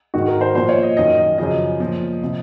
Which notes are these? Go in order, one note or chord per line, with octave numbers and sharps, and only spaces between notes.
G#2 D#3 F#4
A#4
C5
A#2 F3 C5
C#5
D#5
F#2 D#3 D#5
D#5
F#2 C#3 F3 D#5
A#2 F3
C3 F3